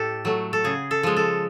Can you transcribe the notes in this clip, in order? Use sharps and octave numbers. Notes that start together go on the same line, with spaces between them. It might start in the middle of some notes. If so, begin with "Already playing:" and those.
Already playing: A2 G4 A4
F#3 A3
A4
C#3 G#4
A4
F3 G#3
A4